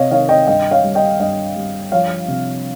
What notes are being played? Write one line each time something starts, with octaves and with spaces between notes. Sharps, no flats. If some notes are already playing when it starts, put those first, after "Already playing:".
Already playing: C3 C#5 D#5 F5
D#3 C#5 F5
D#5 G5
G2 D#5 G5
C#5 F5
G3
D#5 G5
G2 D#5 G5
G3
F3 C#5 F5
C3